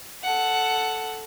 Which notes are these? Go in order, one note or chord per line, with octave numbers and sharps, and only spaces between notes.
A4 F#5